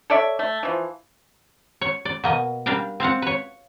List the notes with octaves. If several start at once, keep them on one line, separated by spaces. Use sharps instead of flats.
A4 C#5 D5 E5
A3
E3 F3
C#5
D5
B2 A#3 D#5
G3 A#3 D4 F5 G5
C4 C5 F5 F#5
B4 C#5